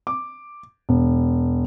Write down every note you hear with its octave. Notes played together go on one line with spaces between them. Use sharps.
D6
E1